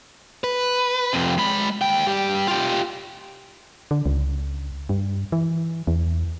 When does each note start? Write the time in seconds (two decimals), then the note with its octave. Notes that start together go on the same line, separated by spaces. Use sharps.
0.44 B4
1.13 F2 C3
1.38 G#3 B5
1.81 D#2 G5
2.06 G2 G4
2.48 F4 G4
3.91 D3
4.06 C#2
4.89 G2
5.32 E3
5.87 E2